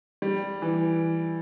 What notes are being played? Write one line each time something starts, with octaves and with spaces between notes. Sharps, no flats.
G3
E3